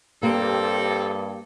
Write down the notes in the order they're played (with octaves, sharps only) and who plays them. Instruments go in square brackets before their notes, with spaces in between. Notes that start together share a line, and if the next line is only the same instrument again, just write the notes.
[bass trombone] G2 [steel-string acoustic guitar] A#3 G4 [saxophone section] C4 A4